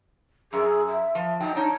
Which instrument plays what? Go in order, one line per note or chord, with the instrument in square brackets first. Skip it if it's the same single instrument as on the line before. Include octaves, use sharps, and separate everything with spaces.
[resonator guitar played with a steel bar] F#2 [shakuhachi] G#4
[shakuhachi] E5
[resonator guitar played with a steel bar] F3
[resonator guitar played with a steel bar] F#3 G5 [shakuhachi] D#4
[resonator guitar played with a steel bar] D4 D#4 [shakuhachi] C#5